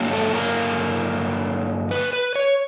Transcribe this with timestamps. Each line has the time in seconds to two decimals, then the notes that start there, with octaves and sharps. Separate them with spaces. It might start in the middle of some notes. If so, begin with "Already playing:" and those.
Already playing: G2 D3 F#3 A#3
0.13 A4
0.35 A#4
1.91 B4
2.13 B4
2.35 C#5